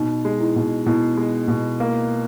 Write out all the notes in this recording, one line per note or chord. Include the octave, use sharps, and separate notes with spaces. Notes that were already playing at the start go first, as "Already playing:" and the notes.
Already playing: B2 D#4
G#3
E4
B2
B2 E4
G#3
B2
A#3